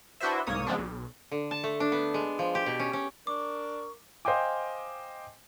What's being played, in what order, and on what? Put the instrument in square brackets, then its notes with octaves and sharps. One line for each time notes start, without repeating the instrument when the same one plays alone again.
[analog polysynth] D4 E4 F#4 B4 C5 E5
C2 G#2 A#3 C#5 D#6
C#3 F3 G#3 B3 C4 D4
B1
[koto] D3
A5
A3
D4
B3
G#3
F3
G4
B2
C#4
C#4
[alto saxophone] D4 [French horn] A#4 [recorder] C#6 [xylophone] D6
[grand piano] C5 D#5 F5 G5 G#5 D6